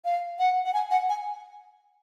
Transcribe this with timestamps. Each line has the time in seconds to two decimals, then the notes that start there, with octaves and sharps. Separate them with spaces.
0.05 F5
0.39 F#5
0.65 F#5
0.73 G#5
0.91 F#5
1.09 G#5